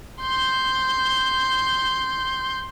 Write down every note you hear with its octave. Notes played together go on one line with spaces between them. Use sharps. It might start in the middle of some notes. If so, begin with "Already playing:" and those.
C6 G6